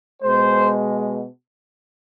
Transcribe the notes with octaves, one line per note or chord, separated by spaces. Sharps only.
B2 G#3 C5